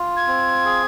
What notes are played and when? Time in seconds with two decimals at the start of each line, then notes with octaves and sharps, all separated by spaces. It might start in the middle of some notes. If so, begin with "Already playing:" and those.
Already playing: F4
0.17 G#6
0.27 C4
0.65 G#4